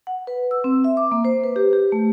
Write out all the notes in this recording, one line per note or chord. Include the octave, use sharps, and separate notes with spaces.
F#5
B4
E6
C4
E5
D6
A#3
C5
B4
G4
G4
A3